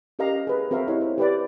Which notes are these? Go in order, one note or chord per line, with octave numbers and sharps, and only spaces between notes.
C#4 G4 A#4 D#5 F5 A#5
G#4 B4
C4 F#4 A#4 E5 F5
D#4 E4 G4 C#5 D#5
C5
G4 B4 D5